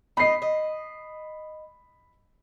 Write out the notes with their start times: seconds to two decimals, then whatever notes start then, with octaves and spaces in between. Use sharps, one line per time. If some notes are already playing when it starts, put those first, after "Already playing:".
0.17 D#4 D#5 B5 C7
0.42 D#5